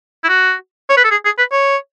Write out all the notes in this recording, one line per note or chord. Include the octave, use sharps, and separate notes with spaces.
E4
F#4
C#5
B4
A4
G#4
G#4
B4
C#5